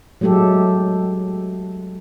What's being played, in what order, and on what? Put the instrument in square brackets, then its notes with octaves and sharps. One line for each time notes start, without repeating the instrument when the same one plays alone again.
[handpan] F#3 G#3 A3 G4 A4